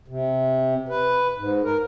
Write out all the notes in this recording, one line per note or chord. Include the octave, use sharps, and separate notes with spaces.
C3
B4
G#2
A#4